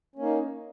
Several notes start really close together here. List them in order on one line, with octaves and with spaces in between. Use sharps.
C#4 A#3 D#4